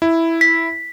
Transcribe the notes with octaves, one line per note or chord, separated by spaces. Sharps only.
E4
B6